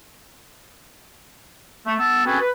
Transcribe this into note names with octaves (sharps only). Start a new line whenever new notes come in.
A3
B3 A5 E6
C4 C#4 F#4 G#4 A4 B4
B4